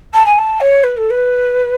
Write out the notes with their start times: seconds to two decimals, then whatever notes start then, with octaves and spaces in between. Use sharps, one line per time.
0.13 A5
0.26 G#5
0.38 A5
0.60 C#5
0.83 B4
0.96 A4
1.10 B4